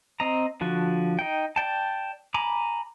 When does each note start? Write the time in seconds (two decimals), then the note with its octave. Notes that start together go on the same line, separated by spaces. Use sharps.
0.20 C4 D#5 A#5
0.61 D3 F3 F#4
1.19 D#4 G5
1.56 D5 G5 A5
2.34 G#5 A#5 B5 D6